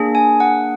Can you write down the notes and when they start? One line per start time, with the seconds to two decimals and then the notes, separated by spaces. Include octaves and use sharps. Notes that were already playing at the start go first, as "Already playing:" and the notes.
Already playing: A#3 D4 G#4
0.15 G#5
0.40 F#5